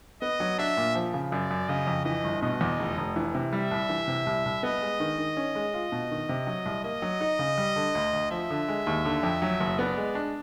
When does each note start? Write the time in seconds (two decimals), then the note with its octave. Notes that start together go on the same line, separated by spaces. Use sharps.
0.22 B3 D#5
0.40 F#3
0.59 D4 E5
0.77 A#2
0.95 F3
1.14 C#3
1.32 F#2 D5
1.51 F#2
1.69 C#3 D#5
1.87 F2
2.05 E3 D#5
2.24 G1
2.42 B2 D#5
2.61 E2
2.79 F1
2.98 F1
3.16 E3
3.35 C3
3.53 G3 E5
3.71 C2
3.89 E3
4.08 C3
4.26 C2
4.45 C2
4.63 B3 D#5
4.82 G#3
5.00 D#3
5.18 D#3
5.37 C#4
5.55 G#3
5.74 F4
5.92 B2
6.11 D#3
6.29 C3
6.47 F#3
6.66 C2
6.84 A#3 D#5
7.02 F#3
7.21 D#4
7.39 C#3
7.58 G3
7.76 D3
7.95 D2
8.13 D2
8.31 F3 E5
8.50 D3
8.68 G#3
8.87 D#2
9.05 D3
9.23 F2
9.42 F#3
9.60 F#1
9.79 B3 D5
9.97 G#3
10.15 D4